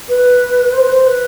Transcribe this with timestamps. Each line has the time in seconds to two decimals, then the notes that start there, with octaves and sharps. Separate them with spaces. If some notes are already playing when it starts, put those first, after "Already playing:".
0.09 B4
0.73 C5
0.81 B4
0.89 C5
1.07 B4